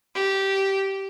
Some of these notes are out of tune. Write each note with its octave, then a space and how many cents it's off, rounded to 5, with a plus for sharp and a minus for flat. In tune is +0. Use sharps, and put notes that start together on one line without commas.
G4 -15